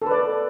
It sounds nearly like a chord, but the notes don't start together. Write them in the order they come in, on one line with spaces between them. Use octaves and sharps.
A4 B4 D5